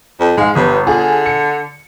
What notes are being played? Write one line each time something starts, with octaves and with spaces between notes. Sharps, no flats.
F2
G#2 G#3 F5
G1 G2 D#6
D3 F4 G#4
C#7